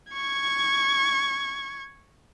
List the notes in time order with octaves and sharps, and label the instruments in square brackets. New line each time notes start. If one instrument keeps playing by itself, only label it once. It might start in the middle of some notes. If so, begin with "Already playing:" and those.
[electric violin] C#6 G#6